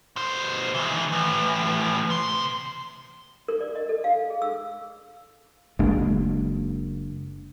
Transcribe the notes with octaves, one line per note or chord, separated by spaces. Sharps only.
B2 C5
D#3 E3
A2 E3
C3 C6
A#4
D5
D#5
A4
F5
G#4
E6
F#1 G#3 A#3 D4